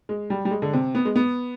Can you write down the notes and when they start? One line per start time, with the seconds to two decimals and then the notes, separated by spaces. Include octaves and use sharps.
0.09 G#3
0.30 G3
0.45 G3
0.51 G#3
0.62 D3
0.74 C3
0.95 B3
1.05 G#3
1.16 B3